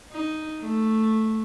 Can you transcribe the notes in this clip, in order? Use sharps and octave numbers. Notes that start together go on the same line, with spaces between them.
D#4
A3